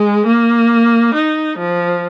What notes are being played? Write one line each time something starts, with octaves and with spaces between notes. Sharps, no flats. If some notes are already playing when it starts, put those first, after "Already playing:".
Already playing: G#3
A#3
D#4
F3